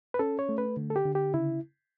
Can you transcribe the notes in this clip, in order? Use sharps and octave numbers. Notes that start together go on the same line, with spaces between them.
B4
C#4 A4
C#5
A3
B4
D3
A4
G4
D3
G4
C#3 E4